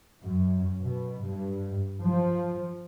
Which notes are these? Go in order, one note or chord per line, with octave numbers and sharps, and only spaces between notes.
F#2
B2
G2
F3